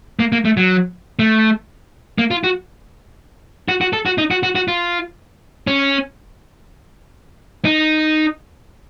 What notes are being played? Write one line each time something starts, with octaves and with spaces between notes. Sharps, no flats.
A#3
A#3
A3
F#3
A3
A#3
F4
F#4
F#4
F#4
A4
F#4
D#4
F#4
F#4
F#4
F4
C#4
D#4